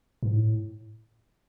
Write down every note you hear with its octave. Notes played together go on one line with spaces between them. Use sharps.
G#2
A2